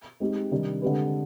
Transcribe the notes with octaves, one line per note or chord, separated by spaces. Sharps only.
G#3 C4 D#4 G4
C3 D#3 G3 D4
D3 G#3 C4 G4 B4